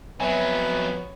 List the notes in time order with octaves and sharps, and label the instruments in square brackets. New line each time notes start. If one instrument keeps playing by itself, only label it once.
[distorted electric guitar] F2 F#3 [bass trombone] B3 [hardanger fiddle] C#5 [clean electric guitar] E5 G#5